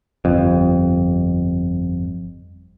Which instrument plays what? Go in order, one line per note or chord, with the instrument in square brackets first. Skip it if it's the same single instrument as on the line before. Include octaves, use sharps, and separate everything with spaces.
[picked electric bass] G1 F2